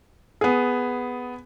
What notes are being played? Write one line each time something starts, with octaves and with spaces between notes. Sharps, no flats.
B3 G#4